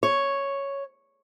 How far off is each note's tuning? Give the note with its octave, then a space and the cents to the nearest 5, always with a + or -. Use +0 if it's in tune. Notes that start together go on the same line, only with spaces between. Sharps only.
C#5 +0